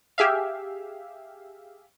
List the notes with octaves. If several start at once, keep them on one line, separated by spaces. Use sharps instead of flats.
G4 G#4 E5 F5